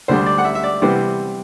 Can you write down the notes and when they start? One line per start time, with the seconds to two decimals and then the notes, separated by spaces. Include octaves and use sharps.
0.08 D2 D3 G3 D4 C5
0.26 D5
0.38 F#5
0.45 E5
0.55 E5
0.63 D5
0.82 C3 E3 G3 B3 C5